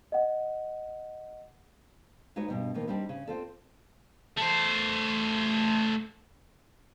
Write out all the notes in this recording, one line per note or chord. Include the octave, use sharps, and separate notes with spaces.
D#5 F#5
G#3 D#4 F4 F#4 B4 C#5
G2 B2 G3
A#2 D#3 F3 A#3 B3
G3 C4 D4 D#4 G4
C#3
C4 F4 A4 D5
A3 C5